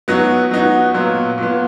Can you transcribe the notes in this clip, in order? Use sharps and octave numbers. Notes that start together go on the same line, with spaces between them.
F#3 B3 D#4 F#4
F#3 B3 D#4 F#4
A#2 F#3 B3
A#2 F#3 B3